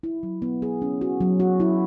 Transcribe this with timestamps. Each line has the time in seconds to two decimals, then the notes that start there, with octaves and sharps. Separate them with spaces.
0.03 E4
0.23 F#3
0.42 B3
0.62 G#4
0.82 C#4
1.01 F#4
1.20 F#3
1.40 F#4
1.60 E4